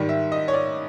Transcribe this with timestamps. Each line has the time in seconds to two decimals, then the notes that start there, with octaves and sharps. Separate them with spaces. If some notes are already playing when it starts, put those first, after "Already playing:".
Already playing: G#2 D#3 G3
0.09 E5
0.32 D#5
0.48 C#5
0.53 D5